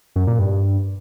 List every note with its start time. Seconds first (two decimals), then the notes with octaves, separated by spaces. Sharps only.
0.16 F#2
0.27 A#2
0.39 G2